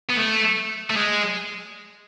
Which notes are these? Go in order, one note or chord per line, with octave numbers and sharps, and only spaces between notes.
B3
A3
A3
G#3